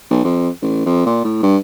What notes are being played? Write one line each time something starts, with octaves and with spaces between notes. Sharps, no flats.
B1
F2
A1
F2
A#2
A2
G2